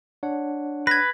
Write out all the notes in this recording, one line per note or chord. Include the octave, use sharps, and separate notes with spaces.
D4 C#5 F#5
B4 G#6 A#6